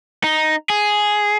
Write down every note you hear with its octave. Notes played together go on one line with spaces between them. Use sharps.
D#4
G#4